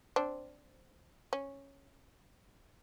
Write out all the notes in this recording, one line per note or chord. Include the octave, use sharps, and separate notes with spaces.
C4 D4 C5
C#4